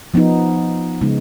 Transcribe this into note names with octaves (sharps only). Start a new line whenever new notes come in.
F3 B3 D#4
C#3 G#3 B3 D#4